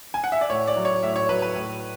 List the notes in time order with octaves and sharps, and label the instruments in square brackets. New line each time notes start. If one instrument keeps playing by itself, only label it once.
[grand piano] G#5
F#5
E5
D5
A2 C#5
D5
F#3
C#5
A2 E5
C#5
F#3 B4
B4
A2